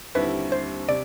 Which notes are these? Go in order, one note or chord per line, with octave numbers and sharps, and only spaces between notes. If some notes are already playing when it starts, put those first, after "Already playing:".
D#2 D3 G3 C4 E4 B4
C5
C3 D5